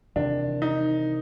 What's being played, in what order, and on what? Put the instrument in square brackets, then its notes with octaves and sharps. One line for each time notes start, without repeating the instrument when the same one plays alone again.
[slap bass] E2 C3 D#3 [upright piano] D4
[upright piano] D#4